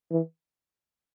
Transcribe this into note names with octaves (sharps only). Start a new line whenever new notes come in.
E3